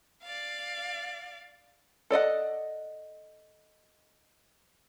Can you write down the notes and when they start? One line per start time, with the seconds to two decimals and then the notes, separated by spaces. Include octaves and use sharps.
0.23 D5 F5
2.11 A4 D5 D#5 F#5